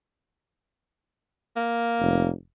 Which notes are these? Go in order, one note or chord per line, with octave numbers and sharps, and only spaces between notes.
A#3
F1